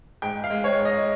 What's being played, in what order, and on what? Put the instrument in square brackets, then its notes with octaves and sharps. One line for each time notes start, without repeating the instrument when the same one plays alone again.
[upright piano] G#2 G5
F5
G#3
C#5
G#2
D#5